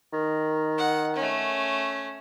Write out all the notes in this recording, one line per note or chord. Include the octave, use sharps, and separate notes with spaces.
D#3
F#5
A3 C#4